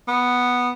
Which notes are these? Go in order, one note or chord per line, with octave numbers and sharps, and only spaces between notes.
B3